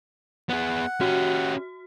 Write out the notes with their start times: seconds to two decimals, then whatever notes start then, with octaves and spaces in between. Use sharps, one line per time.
0.49 B3 G#4 F#5
1.01 C#4 F#4 G4